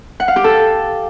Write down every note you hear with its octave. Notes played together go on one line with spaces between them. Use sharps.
F#5
F5
G4
A4